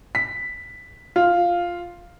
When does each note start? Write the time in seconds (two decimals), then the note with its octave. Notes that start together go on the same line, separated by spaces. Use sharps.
0.15 B6
1.16 F4